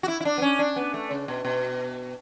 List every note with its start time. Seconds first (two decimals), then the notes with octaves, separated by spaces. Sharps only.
0.03 F#4
0.08 E4
0.20 E4
0.25 D4
0.38 B3
0.42 C#4
0.59 D4
0.76 B3
0.94 A3
1.11 C#3
1.28 B2
1.45 B2